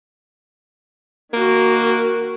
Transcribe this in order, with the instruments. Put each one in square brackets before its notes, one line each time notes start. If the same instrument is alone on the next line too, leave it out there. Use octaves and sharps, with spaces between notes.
[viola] D#3 F#4 [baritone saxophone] A#3